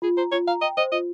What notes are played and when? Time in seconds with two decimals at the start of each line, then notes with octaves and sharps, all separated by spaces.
0.02 F4 G#4
0.17 C5 A#5
0.32 F4 C#5
0.48 F5 A#5
0.61 D#5 G5
0.77 C5 D#5
0.92 F4 D#5